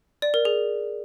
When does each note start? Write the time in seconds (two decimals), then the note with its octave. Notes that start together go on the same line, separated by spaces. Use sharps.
0.22 D5
0.34 A#4
0.45 G#4